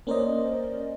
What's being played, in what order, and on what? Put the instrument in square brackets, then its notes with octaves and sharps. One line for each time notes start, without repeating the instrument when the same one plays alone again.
[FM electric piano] A#3 C#4 A#4 C5 D5 D#5